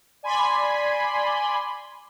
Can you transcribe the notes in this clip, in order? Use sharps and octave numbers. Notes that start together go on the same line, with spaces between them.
D5 G#5 B5 C6